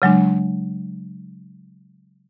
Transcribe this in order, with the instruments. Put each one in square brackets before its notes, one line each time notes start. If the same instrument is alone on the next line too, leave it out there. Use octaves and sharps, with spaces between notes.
[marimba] C#3 F#3 G#3 D4